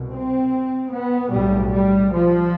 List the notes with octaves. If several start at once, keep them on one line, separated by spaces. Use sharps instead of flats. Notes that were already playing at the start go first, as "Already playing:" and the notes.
Already playing: C2 B2
C4
B3
B1 A2 G3
G3
F3